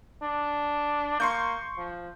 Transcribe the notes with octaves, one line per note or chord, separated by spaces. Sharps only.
D4
A#3 C6 C#6 G6
F3